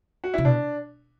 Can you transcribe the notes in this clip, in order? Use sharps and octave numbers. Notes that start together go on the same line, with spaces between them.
F#4
C#3 E4
B2 D4